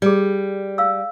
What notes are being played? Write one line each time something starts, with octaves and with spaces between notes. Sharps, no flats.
G3 G#4 D5
F5 E6